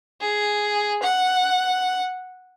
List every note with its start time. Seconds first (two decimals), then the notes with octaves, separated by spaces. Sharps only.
0.21 G#4
1.03 F#5